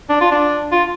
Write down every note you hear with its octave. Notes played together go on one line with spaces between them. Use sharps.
D4
F4
D4
F4